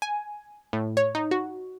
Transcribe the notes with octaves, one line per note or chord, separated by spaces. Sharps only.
G#5
A2
C#5
D#4
F#4